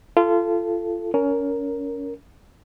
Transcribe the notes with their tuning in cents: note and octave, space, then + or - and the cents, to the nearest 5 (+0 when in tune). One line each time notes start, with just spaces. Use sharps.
F4 -25 A4 +0
C#4 +25 A#4 +0